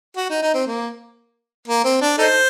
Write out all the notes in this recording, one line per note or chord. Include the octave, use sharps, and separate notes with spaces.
F#4
D#4
D#4
C4
A#3
A#3
C4
D4
D#4 A4 C5